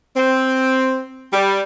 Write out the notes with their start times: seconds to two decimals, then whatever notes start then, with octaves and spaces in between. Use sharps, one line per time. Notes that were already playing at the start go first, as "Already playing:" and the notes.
0.16 C4
1.33 G3